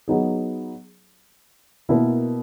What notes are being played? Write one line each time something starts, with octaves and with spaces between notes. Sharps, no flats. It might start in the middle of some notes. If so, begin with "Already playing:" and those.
F#3 B3 D#4 G#4
B2 A#3 E4 A#4